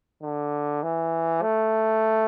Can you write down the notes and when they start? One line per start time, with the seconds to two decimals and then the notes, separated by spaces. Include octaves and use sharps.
0.22 D3
0.83 E3
1.42 A3